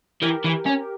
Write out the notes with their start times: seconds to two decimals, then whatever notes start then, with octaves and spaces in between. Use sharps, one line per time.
0.22 E3 G4 A#4
0.44 E3
0.66 C#4